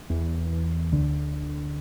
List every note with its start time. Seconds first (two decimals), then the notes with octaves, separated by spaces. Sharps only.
0.10 E2 E3
0.92 D2 D3